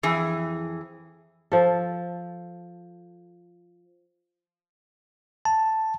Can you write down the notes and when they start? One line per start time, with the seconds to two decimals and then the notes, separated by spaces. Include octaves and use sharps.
0.03 F2 E3 G#4
1.52 F3 A4
5.45 A5